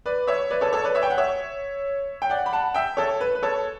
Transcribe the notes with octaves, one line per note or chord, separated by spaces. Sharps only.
B4 D5
C#5 E5
B4 D5
A4 C#5
A4 C#5
B4 D5
C#5 E5
G5
F#5
C#5 E5
G5
D5 F#5
B5
F#5 A5
E5 G5
A4 C#5
B4
B4
A4 C#5